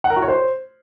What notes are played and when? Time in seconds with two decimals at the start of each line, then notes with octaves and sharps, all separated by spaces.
0.04 F#5
0.10 A#4
0.16 F#4
0.22 C#5
0.28 C5